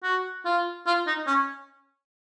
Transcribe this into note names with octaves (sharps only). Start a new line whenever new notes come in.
F#4
F4
F4
D#4
C#4